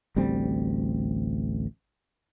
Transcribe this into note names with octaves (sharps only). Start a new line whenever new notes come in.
A1 D2 G3 C4